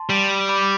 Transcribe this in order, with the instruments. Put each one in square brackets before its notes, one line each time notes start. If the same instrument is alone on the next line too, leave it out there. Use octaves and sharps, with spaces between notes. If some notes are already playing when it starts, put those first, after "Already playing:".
Already playing: [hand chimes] A5 C6
[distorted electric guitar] G3
[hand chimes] B5 D6